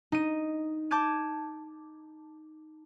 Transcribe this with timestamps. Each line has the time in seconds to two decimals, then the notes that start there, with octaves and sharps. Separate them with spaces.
0.12 D#4 D#7
0.91 A5 D6 G6 G#6 D#7